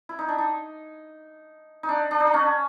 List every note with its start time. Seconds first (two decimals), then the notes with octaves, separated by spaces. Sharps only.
0.09 E4
0.19 D#4
0.28 D4
0.38 D#4
1.83 D#4
1.89 D4
2.11 D4
2.20 D#4
2.27 D4
2.34 C#4